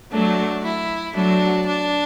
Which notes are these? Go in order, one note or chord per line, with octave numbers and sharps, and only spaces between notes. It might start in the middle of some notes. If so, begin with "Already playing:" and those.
F#3 A3 D4
E4
F#3 A3 D4
D4